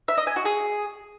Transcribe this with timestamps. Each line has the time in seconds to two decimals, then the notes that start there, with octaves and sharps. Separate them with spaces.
0.08 E5
0.18 D#5
0.27 G#5
0.36 F#4
0.45 G#4